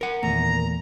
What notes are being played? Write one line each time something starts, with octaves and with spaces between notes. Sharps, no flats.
A#4 F#5
E2 A#2 D#3 A3 A#3 A#5